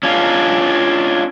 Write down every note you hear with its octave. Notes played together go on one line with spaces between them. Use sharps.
C#4 D4 F4